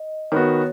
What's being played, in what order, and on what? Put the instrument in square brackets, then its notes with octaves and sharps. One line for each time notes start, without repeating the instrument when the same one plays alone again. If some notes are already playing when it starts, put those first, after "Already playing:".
Already playing: [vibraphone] D#5
[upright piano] D#3 B3 F#4 [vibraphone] C#5